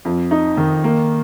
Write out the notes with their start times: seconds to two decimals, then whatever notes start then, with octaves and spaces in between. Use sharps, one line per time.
0.05 F2
0.31 D#4
0.57 D#3
0.84 A#3